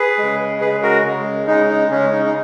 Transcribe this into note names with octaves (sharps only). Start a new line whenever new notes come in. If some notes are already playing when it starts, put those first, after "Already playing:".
Already playing: G#4 B4
C#3 G#3
C#3 G#3 G#4 B4
F#4 A#4
C#3 G#3
C#3 G#3 D#4
D#4
C#3 G#3 C#4
D#4
D#4